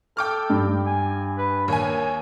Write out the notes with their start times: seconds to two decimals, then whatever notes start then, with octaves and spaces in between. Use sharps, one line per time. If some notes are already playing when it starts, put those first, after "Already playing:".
0.17 A4 G5 D6 F6
0.50 G2
0.87 G#5
1.38 B4
1.68 D#2 C#5 G#5